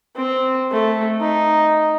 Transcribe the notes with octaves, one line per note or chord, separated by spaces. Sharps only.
C4
A3
D#4